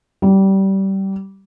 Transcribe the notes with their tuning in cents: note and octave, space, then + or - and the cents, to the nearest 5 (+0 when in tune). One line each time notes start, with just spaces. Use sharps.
G3 -20